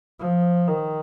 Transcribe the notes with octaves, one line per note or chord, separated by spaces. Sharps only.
F3
D#3